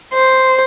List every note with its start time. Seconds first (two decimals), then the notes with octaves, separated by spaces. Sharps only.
0.14 C5